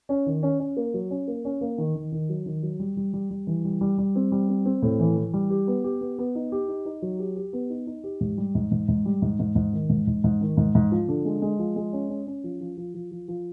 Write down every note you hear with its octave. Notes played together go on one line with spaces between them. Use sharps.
C#4
D#3
C#4
C#4
A#3
F#3
C#4
A#3
C#4
A#3
D#3
D#3
D#3
F#3
D#3
F#3
G3
G3
G3
G3
E3
G3
G3
G3
C4
G3
C4
C4
A2
E3
E3
G3
G4
B3
G4
B3
B3
D#4
G4
D#4
D#4
F#3
G4
G4
B3
D#4
D#4
G4
G#2
G3
G#2
G#2
G#2
G3
G#2
G#2
G#2
D#3
G#2
G#2
G#2
D#3
G#2
G#2
F3
D3
G#3
G#3
F3
G#3
C#4
C#4
C#4
F3
F3
F3
F3
F3
F3